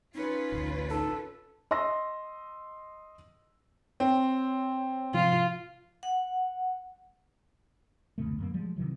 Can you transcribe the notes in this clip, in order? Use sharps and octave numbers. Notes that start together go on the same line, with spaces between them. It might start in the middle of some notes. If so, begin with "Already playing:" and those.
C#4 D#4 F4 B4
A1 D2
D#4 A4
D#5 C6 E6 A#6
C4 C#5
C3 F3 F4
F#5
F#1 D2 B2 A3
E1 F#2 A#3
F3 G3 G#3
C3 D#3 E3 F#3